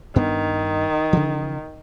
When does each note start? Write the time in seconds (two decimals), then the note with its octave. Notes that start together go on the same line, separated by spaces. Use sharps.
0.16 G2 D#3 B3 D4
1.13 C#3 E3 F3